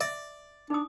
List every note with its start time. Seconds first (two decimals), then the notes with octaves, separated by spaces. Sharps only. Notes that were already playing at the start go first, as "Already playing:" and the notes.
0.01 D5 E5
0.70 D4 D#4 D#6